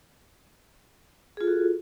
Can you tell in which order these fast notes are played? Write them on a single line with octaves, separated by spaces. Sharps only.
G#4 F4 A4 F#4